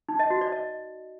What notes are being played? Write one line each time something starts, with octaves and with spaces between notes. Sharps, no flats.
D#4
D#5
F#4
D5
D#5